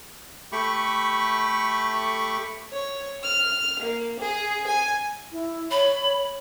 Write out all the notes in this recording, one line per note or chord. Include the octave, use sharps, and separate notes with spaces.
A3 G4 B5 C#6
C#5
F6
A#3
G#4
G#5
E4
C#5 B5